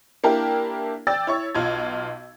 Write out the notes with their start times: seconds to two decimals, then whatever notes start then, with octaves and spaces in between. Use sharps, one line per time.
0.24 A#3 D4 E4 G4 A#4
1.07 D5 G5 E6 A6
1.27 E4 C#5 C#6
1.55 B1 F4 G#6